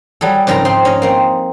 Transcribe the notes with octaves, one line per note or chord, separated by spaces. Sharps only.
F#3 G3 G#4 A4
F2 G#2 C#3 A#4 G5 A#5
C4 D#4 C6
C#4 D#5
A#3 C4 D#4